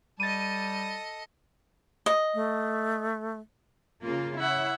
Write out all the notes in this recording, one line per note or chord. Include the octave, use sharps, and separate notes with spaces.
G3 A4 D#5 A6 D#7
D#5
A3
C#3 A#3 F4
E4 C#5 E5 F#5